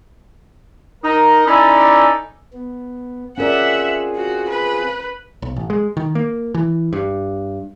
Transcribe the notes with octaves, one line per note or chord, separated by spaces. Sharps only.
D#4 A#4
C#4 D#4 E4 A4 D5 G#5
B3
C4 C#4 F4 G#4 A#4 D5 E5 F#5
F#4
B4
B1
A1
G#3
D#3
A#3
E3
G2